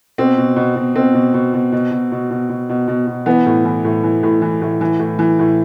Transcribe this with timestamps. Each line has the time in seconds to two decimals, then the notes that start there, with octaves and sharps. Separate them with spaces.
0.18 B2 C4
0.38 B2
0.56 B2
0.76 B2
0.95 B2 C4
1.14 B2
1.34 B2
1.54 B2
1.72 B2
1.91 B2
2.12 B2
2.30 B2
2.49 B2
2.69 B2
2.88 B2
3.07 B2
3.26 E3 B3
3.46 A2
3.65 E3
3.85 A2
4.04 E3
4.23 A2
4.42 E3
4.62 A2
4.81 E3
5.00 A2
5.19 E3
5.39 A2